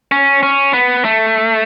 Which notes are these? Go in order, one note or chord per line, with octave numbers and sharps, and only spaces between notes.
C#4
C#4
B3
A3